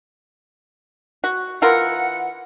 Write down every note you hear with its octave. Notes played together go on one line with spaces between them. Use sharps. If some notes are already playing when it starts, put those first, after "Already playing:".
F#4
E3 F4 A#4 F#5